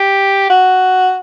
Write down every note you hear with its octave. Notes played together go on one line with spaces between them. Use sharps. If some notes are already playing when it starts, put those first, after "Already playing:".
Already playing: G4
F#4